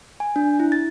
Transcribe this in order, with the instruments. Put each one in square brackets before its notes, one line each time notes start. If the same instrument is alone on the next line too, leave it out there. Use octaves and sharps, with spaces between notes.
[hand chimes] G#5
D4
E4
A6